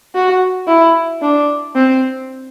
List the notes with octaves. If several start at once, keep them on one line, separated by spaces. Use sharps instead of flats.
F#4
E4
D4
C4